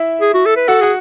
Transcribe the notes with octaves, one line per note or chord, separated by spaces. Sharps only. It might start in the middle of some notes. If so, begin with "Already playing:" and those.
Already playing: E4 E5
G#4
F#4
A4
B4
F#4 A4 F#5
G#4 F#5